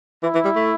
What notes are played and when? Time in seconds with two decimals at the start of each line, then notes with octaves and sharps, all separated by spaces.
0.23 E3 E4
0.35 E3
0.45 G3
0.56 A3